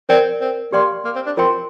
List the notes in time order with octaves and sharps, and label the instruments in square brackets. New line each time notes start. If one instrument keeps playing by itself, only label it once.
[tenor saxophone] C4 [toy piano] A#4 D5 G5
[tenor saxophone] C4
[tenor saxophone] A#3 [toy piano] G4 D5 G5 C6
[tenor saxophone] A#3
C4
D4
[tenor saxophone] C4 [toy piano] F4 A#4 D#5 G5 C6